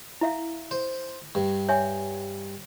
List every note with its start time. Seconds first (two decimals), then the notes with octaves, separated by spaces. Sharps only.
0.21 E4 E5 F5
0.71 C5
1.35 G2
1.69 C#5 E5 G#5